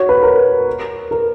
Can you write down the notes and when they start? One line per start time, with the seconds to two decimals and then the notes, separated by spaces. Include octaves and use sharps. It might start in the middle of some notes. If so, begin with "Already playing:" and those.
Already playing: F#4 C#5
0.09 B4
0.23 A#4
1.11 A#4